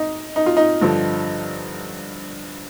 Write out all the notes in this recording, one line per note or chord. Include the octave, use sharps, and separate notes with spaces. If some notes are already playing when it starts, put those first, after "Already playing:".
Already playing: D#4
D#4
F4
D#4
G2 D3 F3